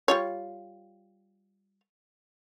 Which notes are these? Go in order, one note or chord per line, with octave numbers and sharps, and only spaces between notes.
G3 F4 C#5